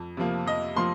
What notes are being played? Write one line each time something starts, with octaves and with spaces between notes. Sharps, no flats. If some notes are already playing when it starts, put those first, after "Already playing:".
Already playing: F2
C3 F3 A#3
F2 D#5
F3 A#3 C6